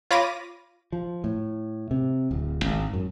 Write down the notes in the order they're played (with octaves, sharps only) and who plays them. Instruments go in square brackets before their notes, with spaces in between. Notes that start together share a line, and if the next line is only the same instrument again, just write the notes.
[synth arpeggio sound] F4 C#5 B5 D6 A#6 D#7
[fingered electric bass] F3
A2
C3
D1
G#1
F#2